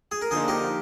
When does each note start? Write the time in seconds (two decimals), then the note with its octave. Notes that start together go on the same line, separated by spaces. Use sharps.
0.11 G#4
0.21 A#4
0.31 D3 F3 A#3 D#4 G#4 C5
0.48 G4 A#4